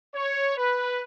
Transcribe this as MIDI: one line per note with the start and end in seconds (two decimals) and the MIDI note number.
0.14 0.54 73
0.58 1.02 71